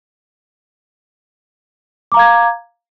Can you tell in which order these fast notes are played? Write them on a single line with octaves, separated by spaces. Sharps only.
D6 A#5 F5 G#6